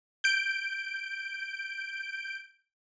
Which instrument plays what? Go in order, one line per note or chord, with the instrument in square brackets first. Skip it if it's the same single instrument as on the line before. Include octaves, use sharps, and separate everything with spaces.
[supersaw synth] G6 D7